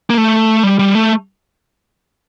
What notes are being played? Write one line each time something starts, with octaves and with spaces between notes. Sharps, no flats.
A#3
A3
G3
G3
A3